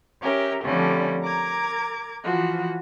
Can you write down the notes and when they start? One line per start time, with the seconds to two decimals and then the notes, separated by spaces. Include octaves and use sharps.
0.20 C#4 G4 A#4 E5
0.63 D3 F3 G3 A3 C4 C#4
1.22 A#4 A#5 D6 G#6
2.23 E3 F3 F#4